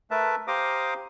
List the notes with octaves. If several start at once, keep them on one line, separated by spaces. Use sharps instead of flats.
A3 A#4 B4 E5 A5
G4 C5 F5 A#5 D6 D#6